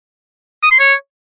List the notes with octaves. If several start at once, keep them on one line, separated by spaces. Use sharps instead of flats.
D#6
C6
C#5